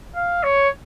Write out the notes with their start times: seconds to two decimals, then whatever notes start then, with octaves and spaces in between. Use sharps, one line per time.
0.15 F5
0.43 C#5